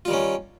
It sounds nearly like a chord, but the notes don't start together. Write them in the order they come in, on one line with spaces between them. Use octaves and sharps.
F4 G3 D#3 C#4